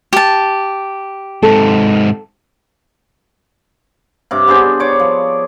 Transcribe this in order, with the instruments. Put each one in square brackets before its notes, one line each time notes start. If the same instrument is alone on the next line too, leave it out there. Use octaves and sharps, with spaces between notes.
[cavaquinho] G4 A5
[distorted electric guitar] G#2 C3 [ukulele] A4
[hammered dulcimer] G2 C3 D6
B3 D4 G#4 C5
C#5 D5 D6
F3